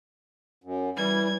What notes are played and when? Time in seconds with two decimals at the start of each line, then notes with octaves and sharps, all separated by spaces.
0.64 F#2
0.97 E3 G3 G#6